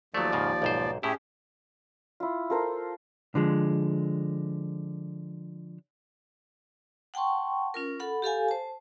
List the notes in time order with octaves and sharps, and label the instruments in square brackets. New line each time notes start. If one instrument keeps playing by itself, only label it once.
[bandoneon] D#2 F3 D5 [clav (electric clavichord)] F#3 A3
[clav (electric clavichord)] G#2 C#3 A#3
B1 G#2 C5
[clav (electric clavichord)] A2 E4 [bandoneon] C#4 G4 G#4
[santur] E4 F4
F4 A4 A#4 C5
[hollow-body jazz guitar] D3 F3 G#3
[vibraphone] F#5 G5 A5 C6 C#6
C#4 F4 A#4
A4 F#5 B5
G4 A4 F5 G#5
C5 A5